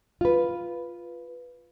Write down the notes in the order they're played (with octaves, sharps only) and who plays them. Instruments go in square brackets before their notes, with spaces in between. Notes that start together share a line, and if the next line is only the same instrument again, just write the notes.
[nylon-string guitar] F4 B4